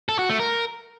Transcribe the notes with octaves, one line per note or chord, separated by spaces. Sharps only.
A4
F#4
A3
A#4